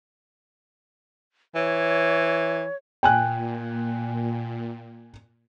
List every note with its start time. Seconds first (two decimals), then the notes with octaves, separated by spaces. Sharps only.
1.55 E3 C#5
3.03 A#2 G5 G#5 F#6